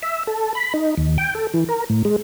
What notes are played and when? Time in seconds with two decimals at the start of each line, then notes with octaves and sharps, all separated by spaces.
0.02 E5
0.27 A4
0.55 B5
0.74 D#4
0.98 D#2
1.18 G5
1.35 A4
1.54 E3
1.69 A#4
1.90 A2
2.05 G#3